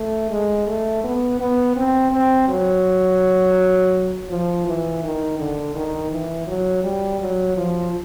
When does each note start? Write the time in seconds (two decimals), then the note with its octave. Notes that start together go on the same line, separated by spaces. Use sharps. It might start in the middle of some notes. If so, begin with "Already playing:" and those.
Already playing: A3
0.31 G#3
0.67 A3
1.04 B3
1.40 B3
1.76 C4
2.12 C4
2.48 F#3
4.30 F3
4.66 E3
5.03 D#3
5.39 D3
5.75 D#3
6.12 E3
6.47 F#3
6.83 G3
7.20 F#3
7.57 F3